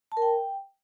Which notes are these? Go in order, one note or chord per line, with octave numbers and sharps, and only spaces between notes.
A5
A#4
G5